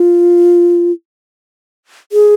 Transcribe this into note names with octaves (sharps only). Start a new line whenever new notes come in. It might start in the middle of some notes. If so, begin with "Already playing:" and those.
Already playing: F4
G#4